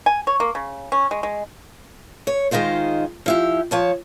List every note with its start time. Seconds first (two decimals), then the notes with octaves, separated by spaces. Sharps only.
0.06 G#5
0.27 C#5
0.40 A#3
0.55 C#3
0.92 C#4
1.11 G#3
1.23 G#3
2.27 C#5
2.51 D#3 G#3 D#4 F4 C5
3.26 F3 E4 G4
3.71 F3 C#5 A5